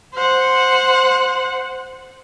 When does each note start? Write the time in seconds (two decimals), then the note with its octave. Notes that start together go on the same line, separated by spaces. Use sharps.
0.15 C5 F#5